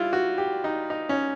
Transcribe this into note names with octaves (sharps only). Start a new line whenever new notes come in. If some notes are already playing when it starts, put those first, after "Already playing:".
Already playing: G3 E4 F4
F#4
G4
D#4
D#4
C#4